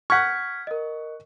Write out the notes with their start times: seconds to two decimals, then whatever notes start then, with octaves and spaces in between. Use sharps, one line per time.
0.10 F#5 C#6 F6 G#6 B6
0.67 A#4 D#5